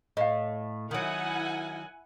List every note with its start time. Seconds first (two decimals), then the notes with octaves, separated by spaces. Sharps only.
0.17 A2 D#5 F5
0.91 D#3 F#3 E4 F#5 G#5